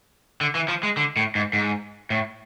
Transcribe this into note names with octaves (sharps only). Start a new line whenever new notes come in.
D3
E3
F3
G#3
D3
A2
G#2
G#2
A2